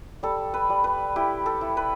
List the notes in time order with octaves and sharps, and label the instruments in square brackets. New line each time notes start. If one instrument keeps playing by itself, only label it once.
[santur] G3 A4
B4
G3
B4
E4 G4
A4
E4
B4